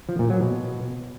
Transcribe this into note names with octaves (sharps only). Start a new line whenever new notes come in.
F3
A#2
F#3
B2